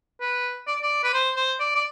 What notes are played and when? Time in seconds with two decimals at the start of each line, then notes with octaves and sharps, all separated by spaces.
0.21 B4
0.67 D5
0.82 D5
1.04 B4
1.14 C5
1.36 C5
1.60 D5
1.75 D5